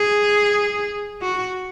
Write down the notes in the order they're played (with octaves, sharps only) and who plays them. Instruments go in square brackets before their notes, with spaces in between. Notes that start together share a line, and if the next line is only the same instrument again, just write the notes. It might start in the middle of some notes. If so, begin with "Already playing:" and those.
Already playing: [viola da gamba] G#4
F#4